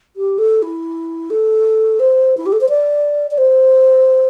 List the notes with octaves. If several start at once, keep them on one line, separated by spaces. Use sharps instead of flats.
G4
A4
E4
A4
C5
E4
G4
A4
C5
D5
D5
C5